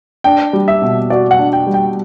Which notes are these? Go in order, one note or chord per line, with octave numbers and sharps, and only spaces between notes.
D4 G5
G3
E5
B2
F#4 D5
F#5
D4
G5
G3
G5